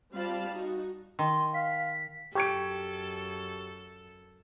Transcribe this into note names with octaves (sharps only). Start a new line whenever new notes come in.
G3 C4 F4 F5 A5 B5
D#4 F#4
D#3 C6
F5 B6
F#2 G4 A4 C#6 G#6 D7